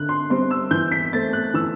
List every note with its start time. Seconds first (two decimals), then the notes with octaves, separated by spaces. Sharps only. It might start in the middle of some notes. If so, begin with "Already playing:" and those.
Already playing: D3 F#6
0.09 C6
0.30 G3 C4 C6
0.51 E6
0.71 E3 G6
0.92 B6
1.13 A3 C4 A6
1.33 F#6
1.54 E3 E6